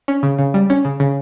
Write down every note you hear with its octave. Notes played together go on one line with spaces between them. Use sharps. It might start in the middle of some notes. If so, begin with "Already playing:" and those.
C#4
C#3
C#3
G3
C#4
C#3
C#3